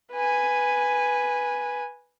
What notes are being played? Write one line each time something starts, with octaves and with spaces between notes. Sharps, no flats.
B4 G#5